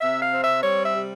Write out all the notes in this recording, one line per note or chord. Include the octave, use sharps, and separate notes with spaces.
C3 E5
F5
C4
E5
G3 C#5
E5
C3